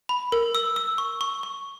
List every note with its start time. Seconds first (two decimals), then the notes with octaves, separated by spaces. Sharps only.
0.09 B5
0.32 A#4
0.55 E6
0.76 E6
0.98 C#6
1.21 C#6
1.43 C#6